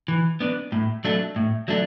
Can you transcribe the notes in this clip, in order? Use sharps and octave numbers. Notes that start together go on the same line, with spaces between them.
E3
B3 D4
A2
F#3 A3 D4
A2
F#3 A3 D4